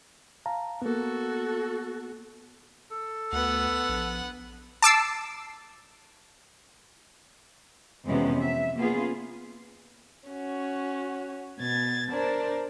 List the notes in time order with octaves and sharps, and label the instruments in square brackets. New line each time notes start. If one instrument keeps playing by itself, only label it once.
[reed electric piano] F5 A5 A#5
[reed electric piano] A#3 B3 [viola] F#4 A4
[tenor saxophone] A4
[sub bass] D2 [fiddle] B3 F#5
[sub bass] A#1
[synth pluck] A5 D6 E6 C7
[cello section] F2 C3 E3 G#3 B3 C#4
E5
A#3 B3 C#4 F4 G#4
[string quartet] C#4 F#4
B2 G#6 A6
D4 A#4 C5 D5 A5